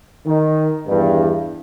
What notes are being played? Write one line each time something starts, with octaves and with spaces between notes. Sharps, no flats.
D#3
E2 G2